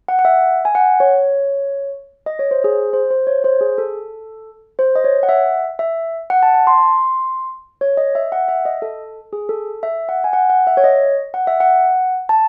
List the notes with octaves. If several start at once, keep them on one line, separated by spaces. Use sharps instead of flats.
F#5
F#5
E5
G#5
F#5
C#5
D#5
C#5
C5
G#4
C5
C5
C#5
C5
G#4
A4
C5
D#5
C#5
F#5
E5
E5
F#5
A5
A5
C6
C#5
D#5
E5
F#5
E5
D#5
A4
G#4
A4
E5
F#5
G#5
F#5
F#5
E5
C#5
D#5
F#5
E5
F#5
A5